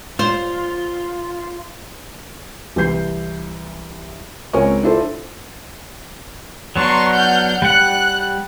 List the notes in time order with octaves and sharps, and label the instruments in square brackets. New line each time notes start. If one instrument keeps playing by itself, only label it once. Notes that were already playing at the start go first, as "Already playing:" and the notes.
[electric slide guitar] F4 [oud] C5
[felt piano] C2 E3 G6 C7
C#2 C4 A#4 C#5 G#5 C#6
D4 E4 F4 A4 C5 E5
[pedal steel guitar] F#3 B3 D4 [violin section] A#5 C6 C#6
[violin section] F#5 F6 G6
[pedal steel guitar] G3 F#5 [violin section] F#6